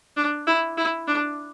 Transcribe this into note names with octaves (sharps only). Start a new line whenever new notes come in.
D4
E4
E4
D4